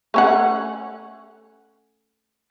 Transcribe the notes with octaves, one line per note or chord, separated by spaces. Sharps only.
A3 C#4 F#5